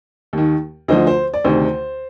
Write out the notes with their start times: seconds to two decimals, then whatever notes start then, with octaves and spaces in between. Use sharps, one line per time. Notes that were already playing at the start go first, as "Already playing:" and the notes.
0.33 D#2 D#3
0.88 D2 D3 F3 C5 D#5
1.07 C5
1.34 D5
1.44 D2 C3 D#3 C5